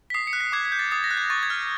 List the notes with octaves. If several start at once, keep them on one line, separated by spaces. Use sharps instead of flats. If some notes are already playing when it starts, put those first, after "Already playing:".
B6
D#6 C7
C#7
F#6
B6
D6 G#6
G#6
G6
A6
D#6 A6
A#6
F#6
G#6
C#6 A6
G#6
F6